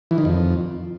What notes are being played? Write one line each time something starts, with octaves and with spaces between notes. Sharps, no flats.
E3
D#3
F2